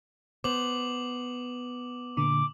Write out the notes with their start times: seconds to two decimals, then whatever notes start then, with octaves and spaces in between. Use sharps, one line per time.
0.44 B3 C5 D6 F#7
2.17 A#2 D3 D6